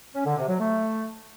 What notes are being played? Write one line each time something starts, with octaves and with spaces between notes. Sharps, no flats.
C#4
D3
C3
F#3
A3